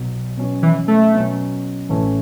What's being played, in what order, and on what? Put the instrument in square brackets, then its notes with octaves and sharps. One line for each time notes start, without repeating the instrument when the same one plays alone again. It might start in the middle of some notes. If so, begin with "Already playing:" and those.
Already playing: [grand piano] B1 B2 F#3
B2 F#3 C#4
[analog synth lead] E3
A3
[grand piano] B2 F#3 C#4
A1 A2 E3 A3 C#4